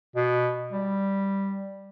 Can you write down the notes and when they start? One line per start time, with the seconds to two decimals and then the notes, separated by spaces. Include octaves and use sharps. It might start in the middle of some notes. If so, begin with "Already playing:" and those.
0.16 B2
0.73 G3